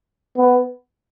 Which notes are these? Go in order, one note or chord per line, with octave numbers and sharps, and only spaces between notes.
B3